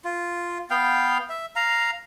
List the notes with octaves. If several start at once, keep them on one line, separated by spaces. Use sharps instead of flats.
F4
B3 F5 G5
E5
F5 A#5